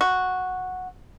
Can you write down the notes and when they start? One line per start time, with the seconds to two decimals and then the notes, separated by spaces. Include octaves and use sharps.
0.01 F#4